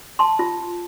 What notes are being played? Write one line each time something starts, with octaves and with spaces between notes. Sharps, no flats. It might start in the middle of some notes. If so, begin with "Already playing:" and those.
A5 C6
F4